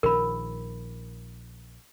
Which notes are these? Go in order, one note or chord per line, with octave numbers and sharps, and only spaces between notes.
A#1 D#3 A#4 B5